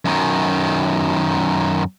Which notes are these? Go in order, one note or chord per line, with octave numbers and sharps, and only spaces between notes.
F#2 D#3